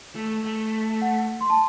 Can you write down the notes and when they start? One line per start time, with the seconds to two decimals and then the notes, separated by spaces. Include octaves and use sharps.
0.15 A3
0.44 A3
1.02 F#5
1.41 C6
1.50 A5